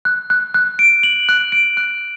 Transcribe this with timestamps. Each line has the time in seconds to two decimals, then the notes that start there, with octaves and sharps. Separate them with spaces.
0.05 F#6
0.30 F#6
0.54 F#6
0.79 D7
1.03 F#7
1.29 F#6
1.52 D7
1.77 F#6